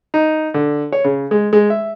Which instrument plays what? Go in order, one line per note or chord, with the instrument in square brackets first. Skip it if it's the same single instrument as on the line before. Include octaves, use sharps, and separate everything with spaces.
[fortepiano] D#4
D3
C#5
C#3
G#3
G#3
E5